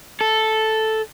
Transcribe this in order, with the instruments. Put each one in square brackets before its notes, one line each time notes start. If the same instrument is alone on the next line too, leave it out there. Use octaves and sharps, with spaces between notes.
[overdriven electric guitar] A4